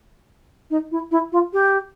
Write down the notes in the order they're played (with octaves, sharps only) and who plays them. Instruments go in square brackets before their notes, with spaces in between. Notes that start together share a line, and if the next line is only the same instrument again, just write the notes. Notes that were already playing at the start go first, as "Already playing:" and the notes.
[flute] D#4
E4
E4
F4
G4